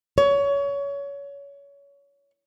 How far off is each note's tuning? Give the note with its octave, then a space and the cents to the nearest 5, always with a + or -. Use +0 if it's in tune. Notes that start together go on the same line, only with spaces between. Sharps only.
C#5 +25